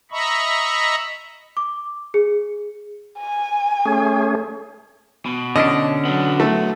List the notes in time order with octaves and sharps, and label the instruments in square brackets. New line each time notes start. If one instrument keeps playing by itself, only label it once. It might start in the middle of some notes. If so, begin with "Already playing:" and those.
[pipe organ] D#5 E5 A#5 B5 C#6
[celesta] D6
G#4
[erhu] G#5
[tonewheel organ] A3 C#4 G#4
[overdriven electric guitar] B2
[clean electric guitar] D3 C#4 D4 [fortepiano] D#5
[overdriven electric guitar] F#3 B3
[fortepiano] A3